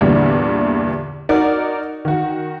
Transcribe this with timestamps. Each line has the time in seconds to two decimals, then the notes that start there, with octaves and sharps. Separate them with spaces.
0.01 E2 G2 A#2 D3 E3 G3
1.29 D#4 F#4 A#4 D5
2.05 D#3 F#4